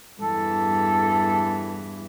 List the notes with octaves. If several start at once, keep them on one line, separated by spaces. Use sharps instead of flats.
E2 G2 E3 A4